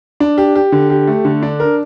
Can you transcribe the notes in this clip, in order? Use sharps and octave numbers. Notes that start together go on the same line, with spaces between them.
D4
G4
G4
D3
G4
A3
D3
D4
A#4